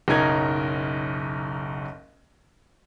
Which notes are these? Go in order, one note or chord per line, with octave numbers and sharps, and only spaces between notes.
F#1 B1 D#4 A#4 G#6